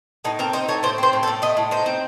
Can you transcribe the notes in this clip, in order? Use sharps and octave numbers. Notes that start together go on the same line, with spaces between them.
A2 D#4
C4 A#4
D#4 C5
A3 C#5
A2 C5
C4 C5
A2
A4
A2
A3 D#5
A2
D#4 C5
C4